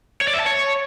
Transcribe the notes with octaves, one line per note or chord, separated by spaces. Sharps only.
C#5
D5
E5
A5
C#5